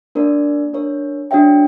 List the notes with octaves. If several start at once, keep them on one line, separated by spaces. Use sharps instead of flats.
A#3 D4 A#4 D5
D4 A#4 C#5
D4 F#4 C#5 E5 G5